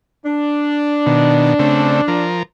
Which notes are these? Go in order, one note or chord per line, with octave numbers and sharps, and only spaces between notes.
D4
B2 D#3
C#3 A3 C4
F3 A#4